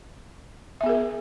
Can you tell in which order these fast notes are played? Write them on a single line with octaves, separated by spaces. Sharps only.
E5 B3 G#4 A#4